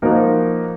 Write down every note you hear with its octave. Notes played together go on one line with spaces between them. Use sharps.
F3 A#3 D#4 F#4 A#4